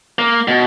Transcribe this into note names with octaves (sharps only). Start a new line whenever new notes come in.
A#3
B2